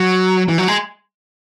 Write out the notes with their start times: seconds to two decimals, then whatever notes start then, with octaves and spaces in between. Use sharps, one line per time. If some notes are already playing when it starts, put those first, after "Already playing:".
Already playing: F#3
0.48 E3
0.58 F#3
0.68 G#3